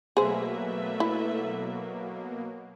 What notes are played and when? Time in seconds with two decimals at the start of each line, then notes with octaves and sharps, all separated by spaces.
0.17 B2 F#3 A3 A#3 G#4 B4 C5 E5
1.00 E4